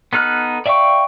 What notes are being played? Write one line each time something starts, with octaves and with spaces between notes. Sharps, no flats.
B3 D#4 A4 F6 F#6
D5 E5 F5 G5 C#6